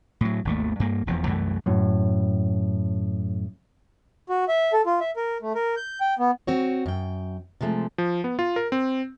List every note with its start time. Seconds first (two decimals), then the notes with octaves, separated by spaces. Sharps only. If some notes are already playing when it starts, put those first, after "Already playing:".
0.21 A2 F#3
0.45 G#1 D#2 A3
0.80 G2 A#3
1.07 E1 E2 F3
1.26 C2 F#2 E3 A3
1.66 F#2 A2
4.29 F#4
4.48 E5
4.73 A4
4.86 F4
5.00 E5
5.16 A#4
5.42 A3
5.55 A#4
5.77 G6
6.00 G5
6.19 B3
6.47 C4 F#4 C#5
6.86 F#2 G5
7.61 C3 F3 G#3 A3
7.98 F3
8.24 B3
8.39 F4
8.56 A#4
8.72 C4